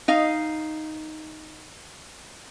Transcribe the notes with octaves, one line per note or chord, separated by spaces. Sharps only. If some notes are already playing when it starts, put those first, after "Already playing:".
D#4 F5